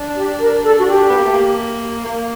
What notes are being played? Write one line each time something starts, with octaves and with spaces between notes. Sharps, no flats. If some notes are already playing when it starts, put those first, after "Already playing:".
Already playing: D4
G4
A#4
A4
F#4
G4
B3
A#3
A3
A#3
A#3